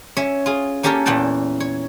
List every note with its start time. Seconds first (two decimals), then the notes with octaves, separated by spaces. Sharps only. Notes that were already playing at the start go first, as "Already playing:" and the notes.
0.17 C#4 C#5 E5
0.46 F4 G#4
0.83 A#3 C#4 G4 A4 A#4 C#5
1.06 E2 A#2 E3 F#5 G5 A5
1.60 C#5